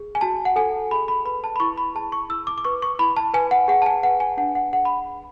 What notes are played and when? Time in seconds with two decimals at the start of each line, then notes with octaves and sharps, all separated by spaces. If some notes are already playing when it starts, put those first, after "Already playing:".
Already playing: G#4
0.15 G#5
0.21 F#4 A5
0.45 F#5
0.56 A4 G#5
0.91 G#4 B5
1.08 B5
1.25 B4 B5
1.44 A5
1.56 B5
1.60 E4 C#6
1.78 B5
1.95 G#4 A5
2.12 C#6
2.29 E4 E6
2.47 D6
2.58 D6
2.65 B4 C#6
2.82 C#6
2.99 E4 B5
3.17 A5
3.34 B4 G#5
3.51 F#5
3.68 G#4 F#5
3.82 A5
3.86 G#5
4.03 B4 F#5
4.20 G#5
4.37 D4 F#5
4.55 F#5
4.73 G#4 F#5
4.85 B5